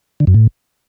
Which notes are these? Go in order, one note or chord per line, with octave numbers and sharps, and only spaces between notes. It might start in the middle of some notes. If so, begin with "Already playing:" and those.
D3
F#2
A2